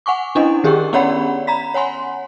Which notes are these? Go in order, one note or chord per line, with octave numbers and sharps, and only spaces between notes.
F#5 G#5 C#6 D6
C#4 D4 E4 D#5 F#5
D#3 G4 G#4 A#4 G5 C#6
B3 C#4 C#5 D5 F#5 B5
A#5 B5 B6
C#5 F#5 G#5 C6